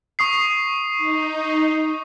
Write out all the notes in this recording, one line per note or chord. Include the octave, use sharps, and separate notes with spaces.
C#6 D#6 C7
D#4